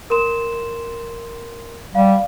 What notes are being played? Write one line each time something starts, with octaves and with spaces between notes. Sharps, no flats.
A#4 C6 E7
G3 F5